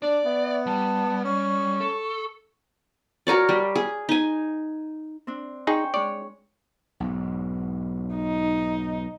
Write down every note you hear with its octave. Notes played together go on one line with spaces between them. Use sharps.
D4 D5
B3 E5
G3 A5
C#4 C#6
A4
F#4 A#4 C#5 D5
G3
G#4
D#4 G#5
C4 D4
D#4 G#4 C5 G5 C#6
G#3 C#5 D5
B1 G#2
D#4